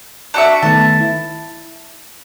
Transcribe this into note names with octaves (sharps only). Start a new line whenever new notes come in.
D4 F#4 E5
D#3 A3 B3 A5
E4